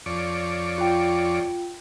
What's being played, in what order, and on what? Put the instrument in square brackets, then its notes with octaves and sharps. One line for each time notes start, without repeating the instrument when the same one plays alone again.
[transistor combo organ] F2 C#5 D5
[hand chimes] F4 G5